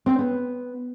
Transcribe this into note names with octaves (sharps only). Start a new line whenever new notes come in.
C4
B3